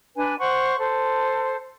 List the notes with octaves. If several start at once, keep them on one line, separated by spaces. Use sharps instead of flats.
D4 B4 G#5
C5 F#5 C#6
A4 C5